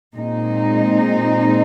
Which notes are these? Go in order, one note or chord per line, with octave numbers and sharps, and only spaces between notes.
A#2 G#3 C4 D#4